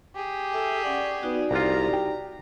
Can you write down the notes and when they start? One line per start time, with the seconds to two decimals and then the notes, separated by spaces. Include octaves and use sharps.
0.16 G4 G#4
0.54 A4 E5
0.84 C#4 D5 F#5
1.22 B3 D#4 F#4 D5
1.51 C2 F4 G4 A#5
1.93 G5